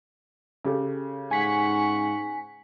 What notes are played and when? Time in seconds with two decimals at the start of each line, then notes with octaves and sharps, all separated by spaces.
0.65 C#3 G4 A4
1.31 G#2 F#5 G#5 C#6 B6